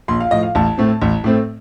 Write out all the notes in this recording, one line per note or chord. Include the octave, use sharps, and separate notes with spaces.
A#1 C6
F5
A2 F3 D#5
F5
A1 A5
A2 A3 C4
A1
A2 A3 C4